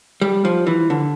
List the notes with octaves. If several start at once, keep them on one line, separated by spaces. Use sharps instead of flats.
G3
F3
E3
D3